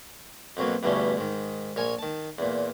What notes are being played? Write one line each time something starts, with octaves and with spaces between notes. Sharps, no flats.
F2 B2 F#3 A#3
E2 G2 B2 D3 A3 C#4
G#2 D#3
A#1 A#4 C#5 G#5 C#6
D#3 A5
E2 A#2